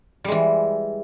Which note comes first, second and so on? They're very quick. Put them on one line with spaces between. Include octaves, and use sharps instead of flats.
G3 G#3 E3